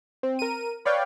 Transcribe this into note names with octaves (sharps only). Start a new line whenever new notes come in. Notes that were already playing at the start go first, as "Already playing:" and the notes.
C4
A#4 D#7
B4 C#5 D5 F5 G5